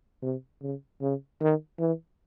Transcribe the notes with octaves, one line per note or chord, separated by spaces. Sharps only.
C3
C#3
C#3
D#3
E3